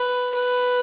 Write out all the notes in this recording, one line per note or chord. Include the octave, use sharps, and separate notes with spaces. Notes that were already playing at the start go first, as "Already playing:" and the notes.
Already playing: B4
B4